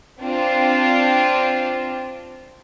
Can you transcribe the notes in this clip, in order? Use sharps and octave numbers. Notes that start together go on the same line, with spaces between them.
C4 D4 F4